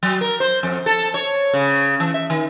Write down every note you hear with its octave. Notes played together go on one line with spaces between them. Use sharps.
F#3
A#4
C5
F2
A4
C#5
C#3
E3
E5
D#3